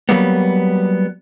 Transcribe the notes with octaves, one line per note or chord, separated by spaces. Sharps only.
F#3 G3 A#3 B3